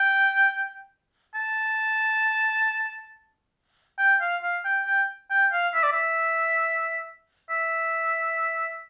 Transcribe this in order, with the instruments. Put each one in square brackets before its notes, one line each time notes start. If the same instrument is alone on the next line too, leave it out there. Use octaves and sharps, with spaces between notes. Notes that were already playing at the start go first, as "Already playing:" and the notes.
Already playing: [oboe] G5
A5
G5
F5
F5
G5
G5
G5
F5
E5
D5
E5
E5